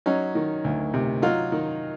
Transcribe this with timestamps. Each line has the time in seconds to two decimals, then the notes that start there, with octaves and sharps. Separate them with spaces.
0.06 F#3 C#4 D#4
0.35 D#3
0.64 D2
0.94 C3
1.22 F#3 D#4 F4
1.52 D#3